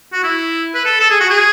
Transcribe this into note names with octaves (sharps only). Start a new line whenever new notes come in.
F#4
E4
B4
A4
A4
G#4
F#4
G#4